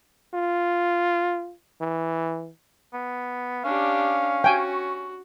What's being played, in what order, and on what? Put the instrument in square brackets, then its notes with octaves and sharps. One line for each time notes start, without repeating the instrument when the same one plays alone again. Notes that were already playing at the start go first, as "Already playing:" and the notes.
[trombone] F4
E3
[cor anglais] B3
[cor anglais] C#4 [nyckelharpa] D4 G4 [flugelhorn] F5
[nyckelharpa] F#4 [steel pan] G5 G#5